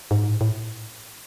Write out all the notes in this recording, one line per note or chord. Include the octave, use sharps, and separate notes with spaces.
G#2
A2
A2